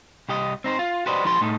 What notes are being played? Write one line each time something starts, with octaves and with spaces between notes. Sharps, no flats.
C2 G4 D#5
C4 D#4 C5
F4
F#4 G4 B4 C5 D5 D#5
F3 E4 G4 C6
A2 A3 D#4